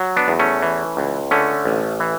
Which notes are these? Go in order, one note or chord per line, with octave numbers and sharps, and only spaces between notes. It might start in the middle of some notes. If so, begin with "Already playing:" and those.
Already playing: F#3
B3 D4
E2
A3 C#4
E3
C#2
D3 A3 C#4
A1
E3